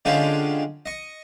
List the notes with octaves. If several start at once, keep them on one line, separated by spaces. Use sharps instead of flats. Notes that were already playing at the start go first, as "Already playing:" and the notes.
D3 G#3 C#4 D4 F4 G4
D#5 C#6